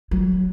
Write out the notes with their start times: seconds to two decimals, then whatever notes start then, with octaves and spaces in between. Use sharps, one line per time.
0.11 F#3